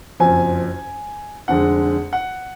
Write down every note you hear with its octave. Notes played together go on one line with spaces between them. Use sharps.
F#1 F2 F3 G#5
F1 F2 D3 G#3 F#5
F#5